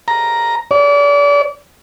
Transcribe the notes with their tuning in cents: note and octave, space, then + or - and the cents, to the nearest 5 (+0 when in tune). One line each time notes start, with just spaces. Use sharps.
A#5 +5
D5 -35